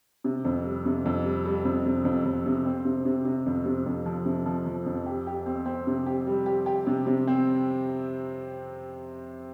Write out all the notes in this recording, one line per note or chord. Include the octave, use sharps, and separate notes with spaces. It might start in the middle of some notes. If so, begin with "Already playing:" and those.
C3
F2
G3
C3
F2
G3
G3
F2
C3
F2
F2
C3
C4
C3
C3
C3
F2
C3
F2
F3
C3
F3
F3
F2
G4
G4
C4
C4
C3
G4
G3
G4
G4
C3
C3
C4